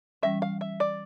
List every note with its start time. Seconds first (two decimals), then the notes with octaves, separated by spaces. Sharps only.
0.23 E3 G3 C#4 E5
0.42 F5
0.61 E5
0.80 D5